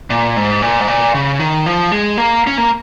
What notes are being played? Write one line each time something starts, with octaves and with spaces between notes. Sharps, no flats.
A#2
G#2
A#2
G#2
A#2
C#3
D#3
F3
G#3
A#3
C#4
A#3